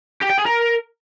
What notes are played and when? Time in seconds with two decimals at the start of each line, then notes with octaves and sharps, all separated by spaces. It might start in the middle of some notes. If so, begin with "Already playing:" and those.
0.21 G4
0.30 G5
0.38 G#4
0.46 A#4